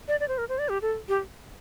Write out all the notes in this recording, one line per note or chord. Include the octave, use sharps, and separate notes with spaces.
D5
D5
C5
A#4
C5
D5
G4
A4
G4